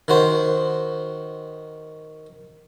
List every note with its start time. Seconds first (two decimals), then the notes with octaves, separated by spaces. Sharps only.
0.08 D#3 F#4 C5